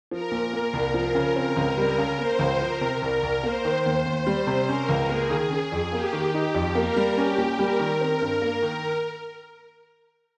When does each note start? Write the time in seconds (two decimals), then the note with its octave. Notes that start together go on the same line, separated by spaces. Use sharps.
0.11 F3 A#4
0.32 A#2
0.53 A#3 A#4
0.73 C2
0.94 F3 A#4
1.15 C#3
1.36 C4 A#4
1.57 C#2
1.78 G3 A#4
1.98 C#3
2.18 A#3 C5
2.39 C#2
2.60 F3 A#4
2.81 C3
3.01 C2 A#4
3.23 C2
3.43 A#3 C5
3.65 D#3
3.86 D#2
4.05 D#2
4.27 G3
4.47 C3
4.68 C#4 A#4
4.89 C#2
5.10 A#3 G#4
5.30 D#3
5.51 C#4
5.72 F2
5.92 A#3 G4
6.13 D#3
6.34 D#4 G4
6.55 F2
6.75 A#3 A#4
6.96 G3
7.17 C#4 G4
7.38 A#2
7.59 G3 A#4
7.80 D#3
8.01 C4
8.22 G2
8.42 A#3
8.63 D#3